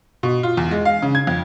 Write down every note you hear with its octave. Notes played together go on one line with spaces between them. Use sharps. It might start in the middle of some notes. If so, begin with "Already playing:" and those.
B2
F4
E2
G#3
F5
C#3
G#6
F2